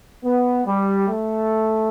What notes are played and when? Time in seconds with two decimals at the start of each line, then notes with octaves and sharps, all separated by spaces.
0.23 B3
0.65 G3
1.07 A3